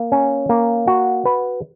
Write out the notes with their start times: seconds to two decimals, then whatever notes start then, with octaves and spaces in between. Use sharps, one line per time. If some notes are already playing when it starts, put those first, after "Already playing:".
Already playing: A#3
0.12 C#4
0.49 A#3
0.87 F#4
1.25 B4